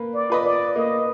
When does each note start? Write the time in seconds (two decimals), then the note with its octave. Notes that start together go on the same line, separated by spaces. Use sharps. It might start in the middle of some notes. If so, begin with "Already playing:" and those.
Already playing: A#3 B4
0.15 D5
0.30 F4 B4 D#5
0.45 D5
0.76 A#3 D#5